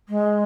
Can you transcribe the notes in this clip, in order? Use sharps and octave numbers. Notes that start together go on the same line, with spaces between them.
G#3